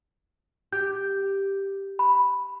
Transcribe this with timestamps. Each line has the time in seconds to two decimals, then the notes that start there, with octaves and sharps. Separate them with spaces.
0.73 G4 G6
1.99 B5